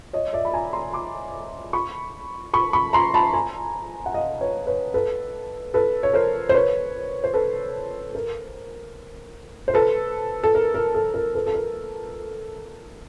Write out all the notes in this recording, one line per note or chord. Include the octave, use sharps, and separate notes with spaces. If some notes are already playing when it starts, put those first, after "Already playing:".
C#5 D#5
D5 E5
B5
G#5 A#5
A#5 C6
C6 D6
B5 C#6
B5 C#6
B5 C#6
A#5 C6
A5 B5
G#5 A#5
F#5
D#5 F5
B4 C#5
B4 C#5
A4 B4
A4 B4
C#5
A#4 C5
C5
B4 C#5
C5
A4 B4
A#4
C5
A4 B4
A4
A#4
A#4
A4
A#4
A4 B4
A4
A#4